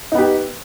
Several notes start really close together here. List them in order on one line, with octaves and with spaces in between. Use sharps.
D#4 B3 G4